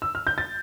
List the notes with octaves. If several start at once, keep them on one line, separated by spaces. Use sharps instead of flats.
E6
F6
G6
A6